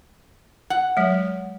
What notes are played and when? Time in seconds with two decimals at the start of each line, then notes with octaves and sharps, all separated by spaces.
0.70 F#5
0.97 F#3 G#3